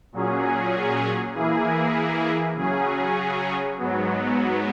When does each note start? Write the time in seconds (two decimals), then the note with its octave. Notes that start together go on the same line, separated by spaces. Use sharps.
0.13 A#2 F#3 C#4 G#4
1.34 E3 A#3 E4 G#4
2.56 C#3 F#3 C#4 G#4
3.78 G#2 F#3 B3